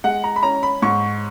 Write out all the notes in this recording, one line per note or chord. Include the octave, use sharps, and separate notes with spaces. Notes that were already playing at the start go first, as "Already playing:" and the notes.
G#3 F#5
A#5
B5
C#4 A#5
B5
G#2 C#6